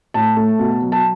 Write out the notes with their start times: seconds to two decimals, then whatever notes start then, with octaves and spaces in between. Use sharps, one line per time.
0.14 A2 A5
0.37 A3
0.59 B2
0.82 F#3
0.92 A5